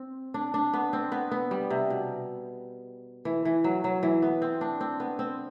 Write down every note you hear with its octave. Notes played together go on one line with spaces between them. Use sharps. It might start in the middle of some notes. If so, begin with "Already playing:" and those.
Already playing: C4
D4
D4
B3
C4
B3
B3
G3
C3
B2
E3
E3
F#3
F#3
E3
B3
C4
D4
C4
B3
C4